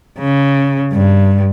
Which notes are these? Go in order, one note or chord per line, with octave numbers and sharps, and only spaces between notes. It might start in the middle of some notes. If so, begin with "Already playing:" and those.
C#3
G2